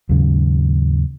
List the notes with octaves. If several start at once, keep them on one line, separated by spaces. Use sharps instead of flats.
D#2 G#2 C#3 F#3